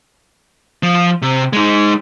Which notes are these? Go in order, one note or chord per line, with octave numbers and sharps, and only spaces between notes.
F3
C3
G#3 D#4